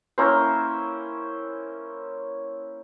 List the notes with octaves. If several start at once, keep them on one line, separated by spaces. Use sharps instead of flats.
A#3 C#4 E4 C5